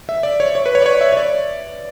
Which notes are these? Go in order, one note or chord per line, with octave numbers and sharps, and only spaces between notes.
E5
D5
C#5
C#5
B4
C#5
D5
C#5
E5
C#5
D5